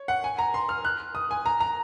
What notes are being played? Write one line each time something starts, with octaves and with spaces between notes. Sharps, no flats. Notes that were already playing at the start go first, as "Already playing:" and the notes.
Already playing: C#5
F#5
G#5
A#5
C6
F6
F#6
D#6
G#5
A#5
A#5